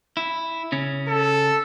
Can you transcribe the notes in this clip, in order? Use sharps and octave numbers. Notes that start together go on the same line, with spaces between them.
E4
C#3 C#4
A4